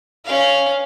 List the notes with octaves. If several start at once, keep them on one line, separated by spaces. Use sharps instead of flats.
C#4 F5